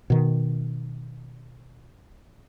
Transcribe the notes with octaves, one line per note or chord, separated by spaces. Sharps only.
B2 D#3